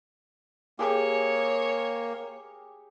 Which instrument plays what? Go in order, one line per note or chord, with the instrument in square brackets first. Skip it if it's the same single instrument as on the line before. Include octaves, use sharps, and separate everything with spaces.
[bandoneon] A#3 [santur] G4 G#4 [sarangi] C#5